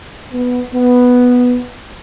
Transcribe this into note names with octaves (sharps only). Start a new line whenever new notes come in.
B3
B3